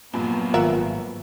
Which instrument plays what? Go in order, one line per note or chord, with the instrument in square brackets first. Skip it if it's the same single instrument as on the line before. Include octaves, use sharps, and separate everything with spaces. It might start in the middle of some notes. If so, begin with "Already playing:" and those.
[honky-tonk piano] A#1 G2 F3 [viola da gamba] F#3 A#3 B3
[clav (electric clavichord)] G#1 F#5 [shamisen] F4 A#4 E5